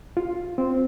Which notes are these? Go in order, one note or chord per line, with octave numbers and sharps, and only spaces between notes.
F4
C4